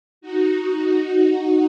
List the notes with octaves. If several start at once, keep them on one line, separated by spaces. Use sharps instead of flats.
D#4 F#4